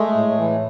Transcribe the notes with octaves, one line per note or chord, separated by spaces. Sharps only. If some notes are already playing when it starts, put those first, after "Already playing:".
Already playing: G#3 A3
A2
E3